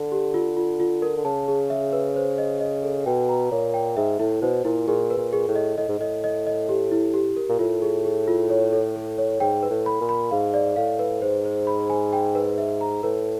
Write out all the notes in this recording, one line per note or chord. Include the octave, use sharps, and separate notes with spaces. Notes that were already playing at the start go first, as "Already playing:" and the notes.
Already playing: D3
G4
F4
F4
F4
A#4
D3
C#3 A5
G#4
E5
B4
C5
D#5
D#5
A4
B2 G5
A#5
A#2 C#5
G5
G#2 E5
A2 E4
B2 C5
A#2 E4
A#2 G#4
B4
A#2
G#4
A2
D#5
A2 D#5
G#2
A2 D#5
D#5
D#5
G4
E4
G4
A#4
A#2
A2 F4
G#4
G#4
F4
C#5
A4
A4
C#5
G#2 G5
B4
A2
B5
A#2
B5
G#2 F5
D5
A2 F5
B4
G#2 C5
C5
B5
G#5
G5
B4
E5
A#5
A2 B4